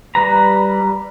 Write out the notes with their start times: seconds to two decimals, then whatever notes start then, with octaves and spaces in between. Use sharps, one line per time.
0.15 G3 B4 A#5